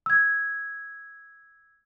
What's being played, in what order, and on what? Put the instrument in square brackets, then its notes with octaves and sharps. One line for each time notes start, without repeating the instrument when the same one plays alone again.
[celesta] E6 G#6